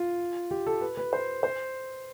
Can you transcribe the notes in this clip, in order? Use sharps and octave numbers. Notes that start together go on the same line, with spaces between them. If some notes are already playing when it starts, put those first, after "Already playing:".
Already playing: F4
G4
A4
B4
B4
C5
C5